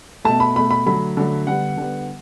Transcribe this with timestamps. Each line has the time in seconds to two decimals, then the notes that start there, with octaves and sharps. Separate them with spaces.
0.25 B2 A3 A5
0.40 B5
0.55 B2 A3 B5
0.71 B5
0.86 D3 F#3 A3 B5
1.17 D3 F#3 A3
1.47 D3 G3 B3 F#5
1.77 D3 G3 B3